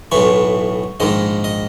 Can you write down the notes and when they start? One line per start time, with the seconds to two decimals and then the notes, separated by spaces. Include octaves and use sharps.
0.12 B1 A2 E3 C#5
1.00 A#1 G#2 D#3 D#5
1.44 D#5